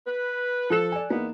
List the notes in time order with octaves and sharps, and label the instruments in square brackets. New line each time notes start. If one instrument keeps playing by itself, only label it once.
[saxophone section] B4
[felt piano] F3 F#6 E7 [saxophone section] A4
[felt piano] D5 G#5
[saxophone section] E2 B3 [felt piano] A#3 D#4